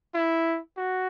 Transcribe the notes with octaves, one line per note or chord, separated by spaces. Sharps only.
E4
F#4